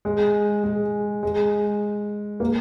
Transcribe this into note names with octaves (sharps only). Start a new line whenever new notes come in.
G#3
G#3
G#3
A#3